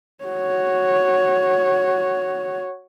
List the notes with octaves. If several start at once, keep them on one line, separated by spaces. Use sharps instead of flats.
F#4 C#5